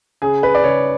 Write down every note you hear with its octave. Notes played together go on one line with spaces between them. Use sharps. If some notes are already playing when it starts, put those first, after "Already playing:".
C#3 G#4
B4
D5
C#3 C#5